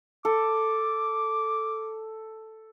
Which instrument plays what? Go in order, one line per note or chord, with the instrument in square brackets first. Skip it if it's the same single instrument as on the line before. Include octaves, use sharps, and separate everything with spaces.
[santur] A4 [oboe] D6